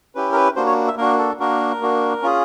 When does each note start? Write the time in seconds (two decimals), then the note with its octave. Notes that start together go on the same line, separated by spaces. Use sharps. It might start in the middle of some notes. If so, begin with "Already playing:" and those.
0.15 C#4 E4 G4 B4
0.32 A#4
0.36 B4
0.56 A#3 D4 F#4 C5
0.66 C#5
0.88 E5
0.97 A#3 D4 F#4 A#4
1.18 A4
1.39 A#3 D4 F#4 A#4
1.81 A#3 D4 F#4
2.22 C#4 F4 G#4